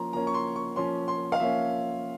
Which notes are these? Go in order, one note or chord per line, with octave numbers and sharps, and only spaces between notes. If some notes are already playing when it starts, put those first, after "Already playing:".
Already playing: F3 A#3 C#4 A#5 C6
F3 A#3 C#4 A#5
C#6
C6
C#6
F3 A#3 C#4 C6
C6
F5
F3 A#3 C#4 E5